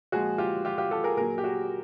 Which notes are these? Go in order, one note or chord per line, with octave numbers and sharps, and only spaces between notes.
A#2 F3 G#3 F#4 G#4
F4 G4
F4 G4
F4 G4
G4 A4
G#4 A#4
A#2 F#3 G#4 A#4
G4
F#4 G#4